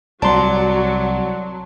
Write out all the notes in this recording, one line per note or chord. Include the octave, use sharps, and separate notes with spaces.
C2 F#3 D5 A5 A#5 C6